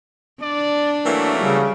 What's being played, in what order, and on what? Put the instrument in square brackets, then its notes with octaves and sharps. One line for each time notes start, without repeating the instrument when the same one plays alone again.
[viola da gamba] D4 [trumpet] D5
[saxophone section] E3 F#3 A#3 [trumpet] A3
[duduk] C#3 [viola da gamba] G3